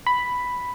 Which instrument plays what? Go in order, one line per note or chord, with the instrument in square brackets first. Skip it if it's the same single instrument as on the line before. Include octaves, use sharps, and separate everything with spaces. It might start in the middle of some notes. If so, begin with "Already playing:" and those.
[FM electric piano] B5